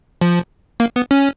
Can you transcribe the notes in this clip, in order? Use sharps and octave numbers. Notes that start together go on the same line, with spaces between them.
F3
A#3
B3
C#4